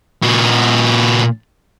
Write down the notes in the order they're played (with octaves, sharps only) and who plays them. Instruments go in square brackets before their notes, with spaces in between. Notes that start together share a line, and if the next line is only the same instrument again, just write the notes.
[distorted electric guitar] A#2 F#4